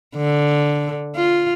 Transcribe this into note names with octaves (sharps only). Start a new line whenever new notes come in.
D3
F4